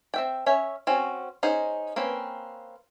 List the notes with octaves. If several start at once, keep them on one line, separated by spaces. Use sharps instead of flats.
C4 E5 G5
C#4 C#5 E5
C4 C#4 F#4
C#4 D#4 G#4 C5
A#3 C4 C#4 B4